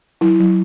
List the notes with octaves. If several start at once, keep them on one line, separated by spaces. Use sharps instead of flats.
F#3 E4
F#3